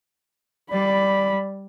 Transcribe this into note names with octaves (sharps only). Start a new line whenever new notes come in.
G3 D5 B5